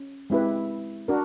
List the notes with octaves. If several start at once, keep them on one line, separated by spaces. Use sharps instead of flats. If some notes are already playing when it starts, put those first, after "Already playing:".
Already playing: C#4
G#3 C4 E4 G4 B4
D4 F#4 A#4